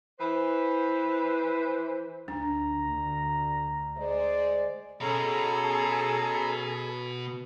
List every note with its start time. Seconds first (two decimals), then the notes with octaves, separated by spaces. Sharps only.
0.19 E3 B4 C5
2.28 D2 D4 A#5
3.97 G#3 C5 D5
5.01 B2 C#4 G#4 A4 A#5